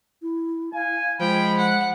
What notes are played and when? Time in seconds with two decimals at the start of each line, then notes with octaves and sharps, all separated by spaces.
0.22 E4
0.74 F5 G#5
1.20 F3 G#3 G5 B5
1.58 F#5